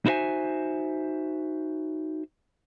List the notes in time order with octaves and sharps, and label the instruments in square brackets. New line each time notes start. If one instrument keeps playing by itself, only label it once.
[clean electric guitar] D#4 E4 F#4 C5 E5 G#5